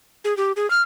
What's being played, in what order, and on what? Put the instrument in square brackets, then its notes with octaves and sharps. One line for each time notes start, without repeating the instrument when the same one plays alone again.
[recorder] G#4
G4
G#4
F6